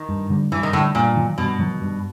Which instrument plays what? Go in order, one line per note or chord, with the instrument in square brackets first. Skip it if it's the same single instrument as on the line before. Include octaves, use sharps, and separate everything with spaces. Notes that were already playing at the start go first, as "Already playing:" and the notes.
Already playing: [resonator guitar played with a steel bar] D#3
[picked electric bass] G2
D3 G3
[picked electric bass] G2 [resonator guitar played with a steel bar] E3
[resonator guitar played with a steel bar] D#3
[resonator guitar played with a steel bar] A2 [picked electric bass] D3
[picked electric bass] G3
[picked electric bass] G2 [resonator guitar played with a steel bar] A#2
[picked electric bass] D#3 F#3
[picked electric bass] G2 [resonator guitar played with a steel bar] B2
[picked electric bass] D#3 F#3
G2